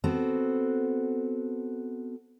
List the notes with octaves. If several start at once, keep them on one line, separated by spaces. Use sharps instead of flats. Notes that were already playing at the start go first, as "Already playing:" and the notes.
B3 C4 F#4 A4